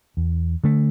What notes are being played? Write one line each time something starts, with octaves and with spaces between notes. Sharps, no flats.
E2
D3 A3